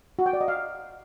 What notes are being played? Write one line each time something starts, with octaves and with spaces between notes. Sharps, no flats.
F#4
G5
D5
D#5
F5